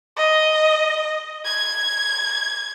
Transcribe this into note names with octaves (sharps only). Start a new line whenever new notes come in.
D#5
G#6